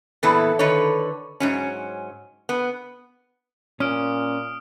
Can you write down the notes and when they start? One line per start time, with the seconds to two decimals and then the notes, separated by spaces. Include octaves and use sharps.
0.23 E2 A#2 E3 B3 E4 A4
0.59 D3 D#3 A4 B4 C#5
1.40 G#2 F#3 C#4
2.49 B3
3.80 A#2 C#4 D#6 F6 D7